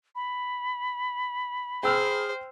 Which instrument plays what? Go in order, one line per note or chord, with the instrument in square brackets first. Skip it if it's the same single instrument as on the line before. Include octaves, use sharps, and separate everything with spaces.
[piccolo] B5
[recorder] G#4 [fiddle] C5 [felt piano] G5 E6 F6